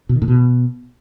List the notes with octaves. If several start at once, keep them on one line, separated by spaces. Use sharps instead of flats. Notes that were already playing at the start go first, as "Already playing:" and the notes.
B2
D#3
A2
B2